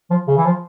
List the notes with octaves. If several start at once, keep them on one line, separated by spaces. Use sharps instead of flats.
F3
C#3
E3
F3